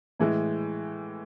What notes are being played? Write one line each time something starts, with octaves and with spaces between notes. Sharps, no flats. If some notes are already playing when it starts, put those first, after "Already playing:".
A2 E3 G#3